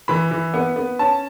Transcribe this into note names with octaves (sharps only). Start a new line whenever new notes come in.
E3 B5
E3
B3
B3
C#4 A5